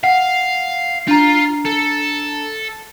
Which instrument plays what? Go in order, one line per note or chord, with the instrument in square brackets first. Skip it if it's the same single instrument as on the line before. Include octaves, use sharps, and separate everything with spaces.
[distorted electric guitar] F5 [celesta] F#5
[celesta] D4 A#5 [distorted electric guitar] F4
[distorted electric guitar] A4